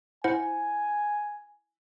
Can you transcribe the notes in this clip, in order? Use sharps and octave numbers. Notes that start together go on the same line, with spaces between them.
E4 C5 F#5 G#5